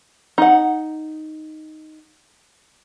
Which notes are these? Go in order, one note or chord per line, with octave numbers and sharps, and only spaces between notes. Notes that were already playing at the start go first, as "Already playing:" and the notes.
D#4 F#5